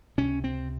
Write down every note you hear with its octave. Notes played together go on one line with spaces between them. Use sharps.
C#2 C3 C#4
C4